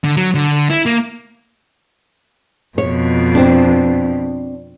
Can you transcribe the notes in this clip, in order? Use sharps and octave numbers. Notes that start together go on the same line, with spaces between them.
D3
F#3
D3
E4
A#3
F2 B2 C#5
C4 D4